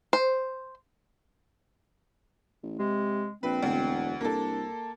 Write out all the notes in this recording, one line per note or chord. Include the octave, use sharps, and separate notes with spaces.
C5
A1
C3 G#3
A#1 C4 B4
E1 D2
C2 A#3 D4 A4